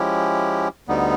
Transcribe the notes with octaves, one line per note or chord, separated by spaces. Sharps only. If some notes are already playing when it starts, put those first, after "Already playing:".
Already playing: F3 G#3 C#4 E4 G4
D2 D3 G3 B3 D#4